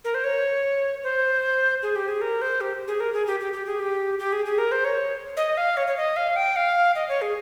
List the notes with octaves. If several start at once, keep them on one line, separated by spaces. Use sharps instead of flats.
A#4
C5
C#5
C5
G#4
G4
G#4
A#4
C5
G4
G#4
A#4
G#4
G4
G4
G4
G#4
G4
G4
G#4
G#4
A#4
C5
C#5
D#5
F5
C#5
C#5
D#5
F5
G5
F5
D#5
C#5
G#4